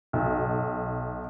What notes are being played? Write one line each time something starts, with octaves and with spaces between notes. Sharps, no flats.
B1